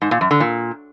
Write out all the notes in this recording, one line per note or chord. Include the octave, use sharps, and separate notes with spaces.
G#2
A#2
F#2
D3
A#2